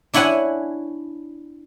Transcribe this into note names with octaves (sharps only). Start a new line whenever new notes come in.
D4 E4 C#5 F#5 G#5